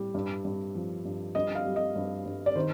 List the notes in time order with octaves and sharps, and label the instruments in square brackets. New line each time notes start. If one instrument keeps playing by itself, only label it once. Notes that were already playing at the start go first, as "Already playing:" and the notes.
Already playing: [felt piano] A2 G3
G2
G2
F3
G2
G2 D#5
F5
G3
D#5
G2
G2
D5
D#3 C5